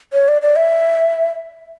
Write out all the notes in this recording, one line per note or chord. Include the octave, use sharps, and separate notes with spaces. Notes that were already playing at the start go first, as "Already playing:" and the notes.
C#5
D5
D5
E5